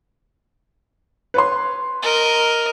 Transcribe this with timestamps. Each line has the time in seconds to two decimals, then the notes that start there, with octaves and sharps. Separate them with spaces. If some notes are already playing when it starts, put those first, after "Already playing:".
1.34 B4 C#5 C6
2.02 A#4 D#5